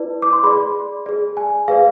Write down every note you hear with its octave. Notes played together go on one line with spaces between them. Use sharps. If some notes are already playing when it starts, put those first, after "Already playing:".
Already playing: E4 B4 D5
D6
C6
G#4 D5 B5
G#4 D5
G#5
G#4 B4 D5 F5